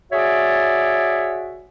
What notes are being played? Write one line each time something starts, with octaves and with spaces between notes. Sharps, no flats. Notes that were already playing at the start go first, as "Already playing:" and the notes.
F#4 G#4 C#5 D5 E5